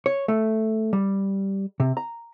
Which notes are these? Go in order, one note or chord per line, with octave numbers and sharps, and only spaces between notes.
C#5
A3
G3
C3
A#5